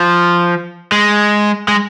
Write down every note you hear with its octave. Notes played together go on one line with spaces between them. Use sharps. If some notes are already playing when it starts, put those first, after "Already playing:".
Already playing: F3
G#3
G#3